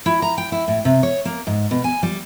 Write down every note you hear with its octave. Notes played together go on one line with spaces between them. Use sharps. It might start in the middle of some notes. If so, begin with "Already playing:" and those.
E4
A#5
G5
E4
A2
C3
C#5
A#3
G#2
B2
G#5
G3